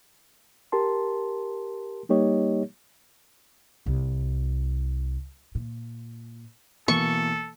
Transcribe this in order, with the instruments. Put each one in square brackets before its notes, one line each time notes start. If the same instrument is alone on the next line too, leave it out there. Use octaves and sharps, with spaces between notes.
[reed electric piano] G4 A#4 A5 C6
G3 A#3 D#4 G4 C#5 D#5
[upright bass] C2
A#2
[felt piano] B2 E3 A#3 [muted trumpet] A4 [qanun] C#6